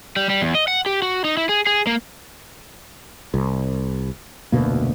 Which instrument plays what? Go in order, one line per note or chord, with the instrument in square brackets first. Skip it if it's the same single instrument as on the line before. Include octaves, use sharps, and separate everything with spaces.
[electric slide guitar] G3
G3
E2
D#5
F#5
G4
F#4
D#4
E4
G#4
G#4
A#3
[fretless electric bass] C2
F1 D2 B2 A#3